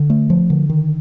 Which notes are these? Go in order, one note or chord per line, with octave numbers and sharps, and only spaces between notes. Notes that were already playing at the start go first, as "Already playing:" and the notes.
Already playing: D3
A3
F3
D3
D#3